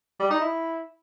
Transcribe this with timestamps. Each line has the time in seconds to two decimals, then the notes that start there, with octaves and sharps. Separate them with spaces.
0.20 G3
0.30 D#4
0.41 E4